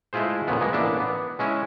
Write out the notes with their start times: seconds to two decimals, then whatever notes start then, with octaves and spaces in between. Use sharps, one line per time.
0.13 G#3 A3 E4 F4 G#4 C5
0.48 F2 A#2 C#3 B3
0.61 G#3 A#3 B3
0.73 A1 A#3 B3 D4 E5
1.00 B3
1.39 G#3 C#4 E4